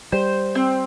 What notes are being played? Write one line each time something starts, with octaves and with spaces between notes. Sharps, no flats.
G3 C5
C4